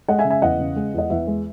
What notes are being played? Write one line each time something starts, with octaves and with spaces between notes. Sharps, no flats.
G#3 D#5 F#5
E5 G#5
C#3
E5 G#5
E2 D#5 F#5
C#3
G#3
E2 D#5
E2 E5
G#3